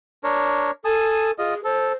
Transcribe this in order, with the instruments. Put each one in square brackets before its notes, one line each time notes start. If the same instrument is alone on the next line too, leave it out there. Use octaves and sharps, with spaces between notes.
[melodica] D4 A#4 C#5
[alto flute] A4 [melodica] G#5 A5 D#6
[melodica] F4 D#5 [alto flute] G#4
[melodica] A4 [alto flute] C5